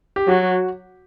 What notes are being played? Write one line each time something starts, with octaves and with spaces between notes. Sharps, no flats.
G4
F#3 F#4